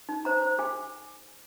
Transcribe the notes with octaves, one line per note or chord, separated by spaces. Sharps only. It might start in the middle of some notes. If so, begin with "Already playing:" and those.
D#4
C5 A#5
C5
G#4 G#5